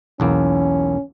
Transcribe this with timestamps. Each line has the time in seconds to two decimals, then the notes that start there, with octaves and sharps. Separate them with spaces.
0.20 B1 E2 A#3 C#4